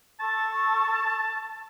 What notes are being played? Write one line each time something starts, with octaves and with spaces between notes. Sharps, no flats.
A4 A5 C#6